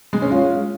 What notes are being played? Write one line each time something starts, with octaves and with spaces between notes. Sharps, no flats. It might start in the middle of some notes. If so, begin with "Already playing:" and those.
G#3
C#4
F4